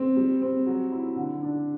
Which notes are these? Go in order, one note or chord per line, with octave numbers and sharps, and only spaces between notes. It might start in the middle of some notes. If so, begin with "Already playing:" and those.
Already playing: C4
G3
C4
F#3
E4
D3
D4